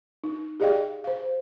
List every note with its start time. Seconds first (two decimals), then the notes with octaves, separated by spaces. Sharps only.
0.24 D#4
0.60 G4 G#4 D5 D#5 F5 G5
1.04 C5 F5